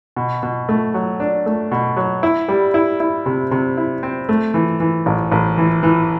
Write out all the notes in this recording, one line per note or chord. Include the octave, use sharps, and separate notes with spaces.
B2
B2
A3
F#3
D4
A3
B2
F#3
E4
G3
E4
E4
C3
C3
E4
C4
A3
E3
E3
A1
A1
E3
E3